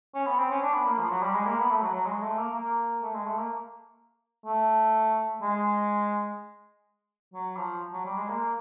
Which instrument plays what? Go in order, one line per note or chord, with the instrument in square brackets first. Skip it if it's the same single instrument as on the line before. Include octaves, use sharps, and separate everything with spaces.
[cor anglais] C#4
B3
C4
C#4
D4
B3
A#3
F3
F#3
G3
G#3
A#3
B3
A3
F#3
F#3
G#3
A3
A#3
A#3
A3
G#3
A3
A#3
A3
G#3
F#3
F3
F#3
G3
G#3
A#3